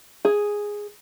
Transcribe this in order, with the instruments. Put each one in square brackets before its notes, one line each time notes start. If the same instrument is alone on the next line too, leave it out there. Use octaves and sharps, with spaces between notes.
[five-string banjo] G#4